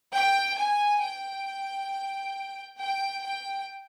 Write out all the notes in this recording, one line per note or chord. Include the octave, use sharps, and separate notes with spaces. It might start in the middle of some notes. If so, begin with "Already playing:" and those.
G5
G#5
G5
G5
G5